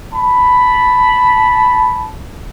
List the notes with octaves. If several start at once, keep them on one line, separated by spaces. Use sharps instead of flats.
A5 B5